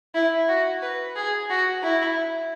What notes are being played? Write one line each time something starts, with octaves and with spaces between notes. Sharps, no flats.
E4
F#4
B4
G#4
F#4
E4